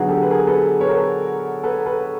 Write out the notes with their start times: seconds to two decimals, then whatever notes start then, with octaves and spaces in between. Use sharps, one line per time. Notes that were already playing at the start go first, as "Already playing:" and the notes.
Already playing: D3 F#3 B3 D4 F#4 G#4
0.09 G4 A4
0.22 B4
0.31 G#4 A#4
0.47 A4 B4
0.81 B4 C#5
0.88 A#4
0.97 A4 B4
1.64 A4 B4
1.86 A4 B4